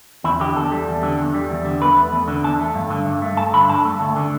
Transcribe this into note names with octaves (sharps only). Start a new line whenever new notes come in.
E2 E4
D3 G4
E2 A4
G3
E2
D3
E2
G3
E2
D3
E2 B4
A3
E2
D3
E2 A5
A3
G2
D3
G2
A3
G2 A5
D3 B5
G2 A5
A3
D2
D3